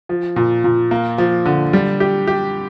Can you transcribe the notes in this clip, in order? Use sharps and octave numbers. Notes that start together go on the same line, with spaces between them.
F3
A#2
A#2
A#3
F3
D3
G3
G4
G4